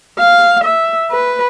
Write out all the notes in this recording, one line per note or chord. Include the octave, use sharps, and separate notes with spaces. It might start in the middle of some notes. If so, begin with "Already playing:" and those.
F5
E5
B4